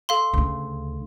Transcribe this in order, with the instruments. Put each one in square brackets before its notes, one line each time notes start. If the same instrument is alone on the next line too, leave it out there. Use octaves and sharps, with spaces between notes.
[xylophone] A4 F5 C6
[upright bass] D2 C#3